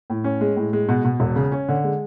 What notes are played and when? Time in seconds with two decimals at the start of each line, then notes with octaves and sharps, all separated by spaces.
0.10 A2
0.24 C#4
0.41 G#3
0.56 A2
0.73 G#3
0.89 B2
1.05 B2
1.20 E1
1.36 C#3
1.52 C#4
1.69 D3
1.84 G#3